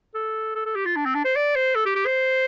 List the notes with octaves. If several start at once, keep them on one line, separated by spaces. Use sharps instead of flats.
A4
A4
A4
G4
F4
D4
C4
D4
C5
D5
C5
A4
G4
G4
C5